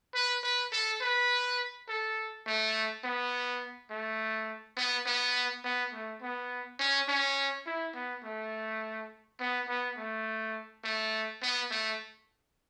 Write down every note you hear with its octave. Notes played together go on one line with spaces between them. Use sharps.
B4
B4
A4
B4
A4
A3
B3
A3
B3
B3
B3
A3
B3
C#4
C#4
E4
B3
A3
B3
B3
A3
A3
B3
A3